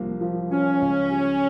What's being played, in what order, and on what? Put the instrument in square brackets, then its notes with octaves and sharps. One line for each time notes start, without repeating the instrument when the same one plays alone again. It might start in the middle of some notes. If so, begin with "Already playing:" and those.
Already playing: [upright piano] C2 F3 A#3
F3
[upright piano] F3 [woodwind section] C#4
[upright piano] C#2
G3